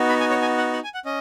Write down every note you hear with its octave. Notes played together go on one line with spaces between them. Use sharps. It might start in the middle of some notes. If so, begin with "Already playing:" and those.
Already playing: B3 D#4 F#4
B5
G#5
C#5
G#5
F#5
F#5
G#5
F#5
C#4 D#5